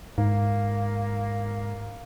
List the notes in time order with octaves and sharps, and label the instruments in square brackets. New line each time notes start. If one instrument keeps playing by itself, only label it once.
[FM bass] G#2 [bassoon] A#3